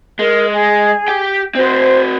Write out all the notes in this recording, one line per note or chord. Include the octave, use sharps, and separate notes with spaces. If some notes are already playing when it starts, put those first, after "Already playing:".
G#3 A#4
G#4
G4 G5
C4 F#4 C5